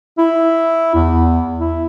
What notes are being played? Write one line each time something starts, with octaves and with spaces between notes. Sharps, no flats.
E4
E2
E4